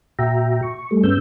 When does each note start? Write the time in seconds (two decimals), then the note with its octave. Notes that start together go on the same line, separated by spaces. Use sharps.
0.19 A#2 F#4 E5 G5 A#5
0.63 C#6
0.91 G3 A3
1.04 G2 G#3 B3 C#4 E6 G6